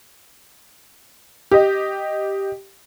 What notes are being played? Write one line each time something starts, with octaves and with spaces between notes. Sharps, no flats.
G4 D#5